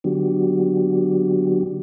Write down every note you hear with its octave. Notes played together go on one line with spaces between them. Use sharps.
D3 F#3 B3 D4 F#4 G4